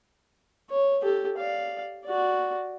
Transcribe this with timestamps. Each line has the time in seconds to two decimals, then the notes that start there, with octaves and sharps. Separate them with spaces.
0.70 C#5
1.03 G4 A4
1.37 D5 F5
2.05 F#4 D5